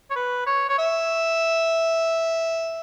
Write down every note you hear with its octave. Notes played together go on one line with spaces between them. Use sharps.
C#5
B4
C#5
C#5
E5